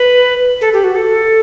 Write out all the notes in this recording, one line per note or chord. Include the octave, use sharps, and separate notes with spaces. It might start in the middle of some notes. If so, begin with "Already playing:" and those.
Already playing: B4
A4
G4
F#4
A4